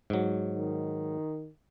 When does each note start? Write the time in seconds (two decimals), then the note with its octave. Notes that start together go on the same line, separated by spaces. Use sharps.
0.10 G#2 F#3
0.55 D#3